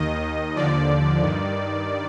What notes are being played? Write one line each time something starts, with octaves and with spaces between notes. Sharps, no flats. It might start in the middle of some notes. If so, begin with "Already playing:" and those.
Already playing: D#2 D#3 D#5
D#2 D3 F3 D5
G2 D#3